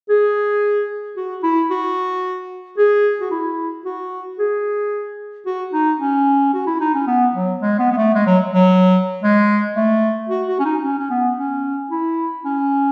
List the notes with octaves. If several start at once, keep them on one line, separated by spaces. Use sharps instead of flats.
G#4
F#4
E4
F#4
G#4
F#4
E4
F#4
G#4
F#4
D#4
C#4
F#4
E4
D#4
C#4
B3
F#3
G#3
B3
B3
A3
G#3
F#3
F#3
G#3
A3
F#4
F#4
C#4
D#4
C#4
C#4
B3
C#4
E4
C#4